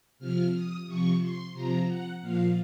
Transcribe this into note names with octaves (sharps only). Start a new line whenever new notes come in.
C3 F3 F6
D#6
C3 F3 C#6
C6
C3 F3 A#5
F#5
A#2 F3 F5